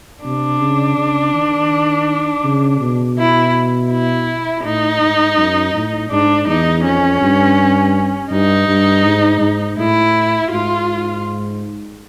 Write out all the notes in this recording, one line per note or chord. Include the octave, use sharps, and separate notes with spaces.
C3 D4
C#3
C#3
D#3
C#3
B2
E4
E4
A2 D#4
G#2
F#2
A2
G#2 D4
E2 D#4
F2 C#4
G2
G2 D#4
G2
G#2
G#2
A2 E4
G#2 F4